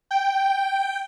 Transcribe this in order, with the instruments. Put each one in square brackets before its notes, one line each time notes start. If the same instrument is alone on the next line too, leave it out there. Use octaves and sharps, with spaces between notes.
[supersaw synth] G5